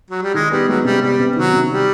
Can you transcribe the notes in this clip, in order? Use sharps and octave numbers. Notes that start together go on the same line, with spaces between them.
F#3
G3
D#3 G#3
G3 B3
F#3 G#3
C3 G3
G3 B3
C3
D#3 F#3
C3
G3